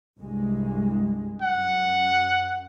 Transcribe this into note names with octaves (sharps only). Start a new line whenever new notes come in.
C2 G2 G#3
F#2 F#5